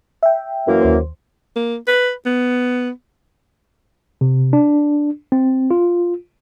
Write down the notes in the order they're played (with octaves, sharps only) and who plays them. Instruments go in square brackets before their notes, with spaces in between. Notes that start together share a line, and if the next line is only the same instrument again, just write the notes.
[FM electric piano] E5 G5
[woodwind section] F#2 E3 A#3
[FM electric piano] D#2 C5
[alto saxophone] A#3
B4
B3
[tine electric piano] C3
D4
C4
F4